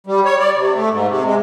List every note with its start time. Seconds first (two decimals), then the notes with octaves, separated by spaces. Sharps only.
0.07 G3
0.25 C#5
0.39 D5
0.57 C3
0.75 A3
0.89 G#2
1.08 C3
1.25 G#3